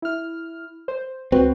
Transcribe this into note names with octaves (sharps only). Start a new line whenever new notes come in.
E4 F6
C5
C#2 C4 F#4 B4